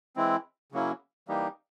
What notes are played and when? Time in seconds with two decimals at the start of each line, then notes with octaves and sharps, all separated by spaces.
0.16 E3 G#3 C4 E4
0.72 C#3 F#3 A#3 C#4 E4
1.28 E3 G3 A#3 D#4 G4